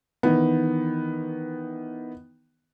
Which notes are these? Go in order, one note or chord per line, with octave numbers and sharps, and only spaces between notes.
D#3 E3 B3